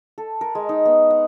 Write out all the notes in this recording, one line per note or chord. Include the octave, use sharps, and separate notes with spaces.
A4
A#4
G#3
D#4
B3
F#5